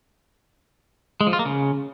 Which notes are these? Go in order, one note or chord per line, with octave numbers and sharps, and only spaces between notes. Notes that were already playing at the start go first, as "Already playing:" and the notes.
G#3
F3
F4
A#3
C#3